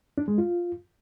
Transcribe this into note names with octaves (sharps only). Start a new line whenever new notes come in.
D4
G#3
F4